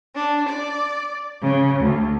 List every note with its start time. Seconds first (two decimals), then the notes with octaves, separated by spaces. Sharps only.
0.14 D4
0.48 D5
1.42 C#3
1.80 D2